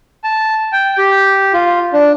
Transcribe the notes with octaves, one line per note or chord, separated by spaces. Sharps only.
A5
G5
G4
F4
D4